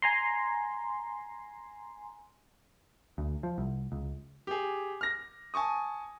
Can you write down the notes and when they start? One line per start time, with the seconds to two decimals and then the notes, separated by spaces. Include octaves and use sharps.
0.02 G#5 A#5 C6
3.18 D2
3.43 F3
3.58 C2
3.92 C#2
4.47 G4 G#4
5.01 F6 A#6
5.54 G#5 A5 C#6 D#6